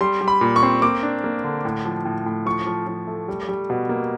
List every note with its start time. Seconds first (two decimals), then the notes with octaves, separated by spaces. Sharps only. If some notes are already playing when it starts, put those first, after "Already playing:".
0.01 G3 C6
0.21 G3
0.28 B5
0.41 A#2
0.56 C#6
0.63 C4
0.82 A#3 D6
1.03 D4
1.24 A#3
1.44 D3
1.65 A2
1.85 F3
2.05 A2
2.26 A2
2.46 F3 C#6
2.67 F3
2.87 F3
3.07 A3
3.28 G3
3.49 G3
3.70 B2
3.89 A#3